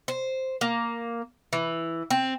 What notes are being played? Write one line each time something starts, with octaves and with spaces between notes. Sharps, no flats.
C5
A#3
E3
C4